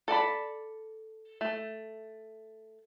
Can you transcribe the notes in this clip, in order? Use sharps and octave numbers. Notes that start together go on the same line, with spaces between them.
A4 D5 A5 B5
A3